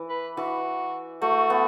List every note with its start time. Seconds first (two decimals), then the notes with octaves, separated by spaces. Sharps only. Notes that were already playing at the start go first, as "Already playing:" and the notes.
Already playing: E3
0.09 B4
0.37 E3 F#4
1.22 A3 F#4
1.50 B3